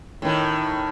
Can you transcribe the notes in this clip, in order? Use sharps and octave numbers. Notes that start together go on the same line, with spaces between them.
A2 D#3